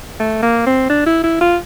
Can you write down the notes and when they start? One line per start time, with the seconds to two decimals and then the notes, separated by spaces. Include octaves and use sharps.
0.20 A3
0.43 A#3
0.66 C4
0.89 D4
1.06 E4
1.23 E4
1.41 F4